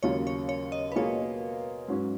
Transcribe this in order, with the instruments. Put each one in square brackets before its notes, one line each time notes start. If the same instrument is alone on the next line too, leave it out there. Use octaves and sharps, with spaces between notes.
[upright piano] D#2 C#3 F#3 A#3 F4 [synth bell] C#5
[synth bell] C#5
C#5
D#5
B4
[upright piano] B2 A#3 F4 G#4 [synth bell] C#5
[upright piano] G#2 F#3 C#4